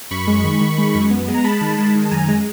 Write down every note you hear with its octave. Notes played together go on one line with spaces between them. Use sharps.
F#2 B5 C#6
G#3
D#3
D#3
G#3
F#2
B3
G#3
A#5
G#3 A5 B5
D#3
G#3
D#3
A5
F#2 G#5 A#5
G#3